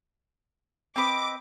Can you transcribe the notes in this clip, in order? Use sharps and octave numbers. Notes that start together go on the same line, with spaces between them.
C4 B4 D#5 D6